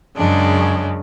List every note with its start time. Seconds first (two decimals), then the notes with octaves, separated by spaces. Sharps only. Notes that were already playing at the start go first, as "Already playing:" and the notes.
0.17 F#2 C#3 G#3 D4